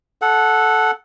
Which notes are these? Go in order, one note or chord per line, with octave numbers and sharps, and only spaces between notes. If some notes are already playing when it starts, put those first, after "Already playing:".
A4 F#5